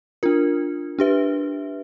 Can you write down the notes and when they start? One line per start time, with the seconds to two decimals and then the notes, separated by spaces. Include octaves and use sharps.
0.23 D4 F4 A#4
0.99 D4 G4 B4 E5